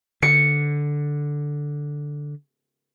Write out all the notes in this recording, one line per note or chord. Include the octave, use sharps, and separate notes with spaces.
D3 C#7